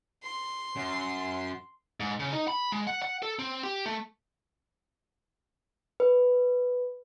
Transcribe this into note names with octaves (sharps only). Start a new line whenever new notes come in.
C6
F#2
G#2
C#3
D#4
B5
G#3
F#5
F#5
A4
C4
G4
A3
B4